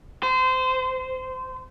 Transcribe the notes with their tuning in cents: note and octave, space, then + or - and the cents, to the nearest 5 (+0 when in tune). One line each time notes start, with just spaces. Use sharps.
C5 -25